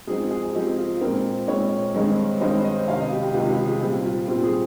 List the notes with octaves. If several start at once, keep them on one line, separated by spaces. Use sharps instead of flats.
G#2 F3 C4 D#4 G#4
G#4
G#2 F3 C4 D#4 G4
F4
A#2 G#3 C4 A#4
A#2 G#3 C4 C#5
G2 D#3 G#3 C4 D#4
G2 D#3 G#3 C4 D#4 C5
D#5
C#2 C3 D#3 F5
D#5
G4
G4
C#2 C3 D#3 F4
G4
G#4
A#2 G3 C4 G4
F4
A#2 G3 C4 F4
G#4